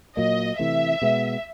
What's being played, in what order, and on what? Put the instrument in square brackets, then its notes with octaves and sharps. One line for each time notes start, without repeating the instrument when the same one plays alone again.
[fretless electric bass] A#2 F#3 A#3 [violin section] D#5
[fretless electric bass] C3 E3 A3 [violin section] E5
[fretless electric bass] B2 G#3 B3